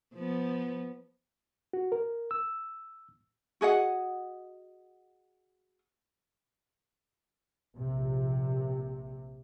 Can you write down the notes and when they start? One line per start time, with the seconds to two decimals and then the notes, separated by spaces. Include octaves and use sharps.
0.15 F3 B3
1.73 F#4
1.92 A#4
2.31 E6
3.61 F#4 G#4 D#5 F#5
7.76 A#1 C3